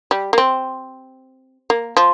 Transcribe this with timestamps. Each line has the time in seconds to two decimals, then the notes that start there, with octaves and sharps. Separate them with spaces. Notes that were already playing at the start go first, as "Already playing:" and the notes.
0.11 G3
0.33 A#3
0.38 C4
1.70 A#3
1.97 F3